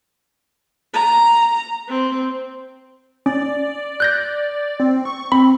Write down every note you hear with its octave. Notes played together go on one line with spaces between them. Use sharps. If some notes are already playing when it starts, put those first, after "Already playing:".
A#5
C4
C#4 D5
F#6 G6 A#6
C4
C#6
C4 B5